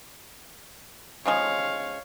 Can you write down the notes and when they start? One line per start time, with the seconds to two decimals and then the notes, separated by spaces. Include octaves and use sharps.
1.26 C#3 F3 G#3 C#5 F5